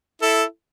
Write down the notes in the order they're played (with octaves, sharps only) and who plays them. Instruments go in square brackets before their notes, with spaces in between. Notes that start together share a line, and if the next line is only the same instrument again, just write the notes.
[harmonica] E4 A4